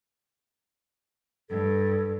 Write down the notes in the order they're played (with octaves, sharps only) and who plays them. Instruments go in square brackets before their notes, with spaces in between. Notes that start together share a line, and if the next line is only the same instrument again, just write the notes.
[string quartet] G2 [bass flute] A4